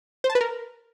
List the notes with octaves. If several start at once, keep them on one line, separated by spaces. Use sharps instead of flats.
C5
A5
B4
A#4